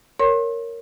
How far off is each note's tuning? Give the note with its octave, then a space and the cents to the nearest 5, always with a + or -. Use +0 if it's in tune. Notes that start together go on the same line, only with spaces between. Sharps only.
A#4 -5 C#5 +0 C6 +40